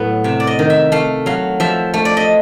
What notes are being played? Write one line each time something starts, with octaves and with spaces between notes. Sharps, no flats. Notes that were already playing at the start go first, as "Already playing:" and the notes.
Already playing: A2 F#3 B3
C3 E5
D5
D#5
D#3
E5
A3 F5
F#3 F5
F3 E5
A3
D5
D#5